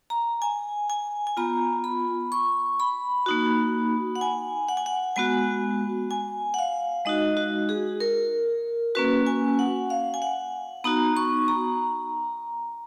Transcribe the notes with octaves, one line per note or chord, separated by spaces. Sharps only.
A#5
G#5
G#5
G#5
B3 F4 A#5
B5
C#6
B5
A#3 D#4 F#4
F#5
G#5
F#5
G#5
F#5
G#3 B3 F#4 G#5
G#5
F#5
F5
G#3 D#4 F#4 D#5
F#4
G#4
A#4
A#3 C#4 F#4 B4
G#5
F#5
F5
G#5
F#5
B3 D#4 F#4 A#5
C#6
A#5